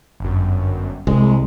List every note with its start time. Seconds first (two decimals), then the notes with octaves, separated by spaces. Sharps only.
0.20 G1 F#2
1.07 C2 G#3